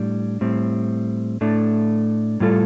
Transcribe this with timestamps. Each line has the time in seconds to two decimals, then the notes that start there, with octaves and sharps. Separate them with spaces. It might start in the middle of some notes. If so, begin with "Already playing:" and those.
Already playing: A2 G3 D4
0.41 A2 G3 C4
1.41 A2 A3 D4
2.40 A2 G3 F4 A4